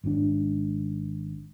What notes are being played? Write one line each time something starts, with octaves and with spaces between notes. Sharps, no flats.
G#1 G#2 C#4 D4